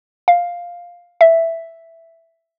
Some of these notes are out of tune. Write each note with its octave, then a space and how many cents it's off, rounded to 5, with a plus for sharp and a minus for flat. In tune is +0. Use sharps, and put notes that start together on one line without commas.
F5 +5
E5 +5